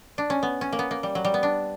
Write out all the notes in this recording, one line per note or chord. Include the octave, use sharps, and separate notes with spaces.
D4
C#4
B3
C#4
A#3
B3
A#3
G3
F#3
G3
B3
D4